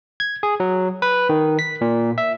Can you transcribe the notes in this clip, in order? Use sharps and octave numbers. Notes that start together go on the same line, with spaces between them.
G#6
G#4
F#3
B4
D#3
B6
A#2
E5